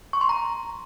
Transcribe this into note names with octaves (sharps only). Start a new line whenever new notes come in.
C#6
C6
A#5